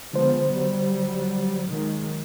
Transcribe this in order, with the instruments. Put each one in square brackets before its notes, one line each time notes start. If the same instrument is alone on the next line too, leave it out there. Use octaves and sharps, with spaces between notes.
[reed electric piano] D3 C5 [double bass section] F3 G#3 B3
[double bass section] F#3 G3
D#3 F#3 G#3